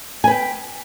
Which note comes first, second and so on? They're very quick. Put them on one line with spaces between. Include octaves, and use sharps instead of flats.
G#5 B4 G5